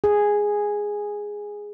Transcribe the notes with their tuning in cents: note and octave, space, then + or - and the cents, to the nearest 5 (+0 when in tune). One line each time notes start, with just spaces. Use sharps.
G#4 -5